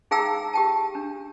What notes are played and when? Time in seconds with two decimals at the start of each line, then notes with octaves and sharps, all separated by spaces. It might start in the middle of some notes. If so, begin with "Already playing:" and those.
0.11 D#4 G#4 F5 G5 A#5 E6
0.54 G4 G5 A5
0.95 D4